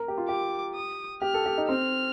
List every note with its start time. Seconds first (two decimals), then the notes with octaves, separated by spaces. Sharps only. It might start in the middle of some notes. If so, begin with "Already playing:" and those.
Already playing: A#4
0.08 G4
0.18 F4
0.28 G4 D6
0.75 D#6
1.22 G4 F6
1.34 A4
1.46 G4
1.58 D#4
1.69 C4 F6